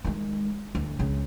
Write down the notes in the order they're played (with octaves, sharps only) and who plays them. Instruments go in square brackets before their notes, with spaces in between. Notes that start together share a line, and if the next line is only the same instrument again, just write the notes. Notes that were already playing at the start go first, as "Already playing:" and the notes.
[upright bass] D#3 G#3
D2
C#2 C#3